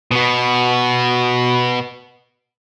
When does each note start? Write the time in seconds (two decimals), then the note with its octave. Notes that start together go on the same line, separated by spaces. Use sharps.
0.11 B2 B3